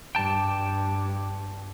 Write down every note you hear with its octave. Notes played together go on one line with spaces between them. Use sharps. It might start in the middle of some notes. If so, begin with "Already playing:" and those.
G2 G5 A5